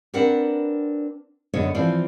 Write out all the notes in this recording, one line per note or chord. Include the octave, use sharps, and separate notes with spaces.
C4 D4 A#4 B4 F#5
F#2 D3 B3 C#5 D#5
E3 F3 C4 D5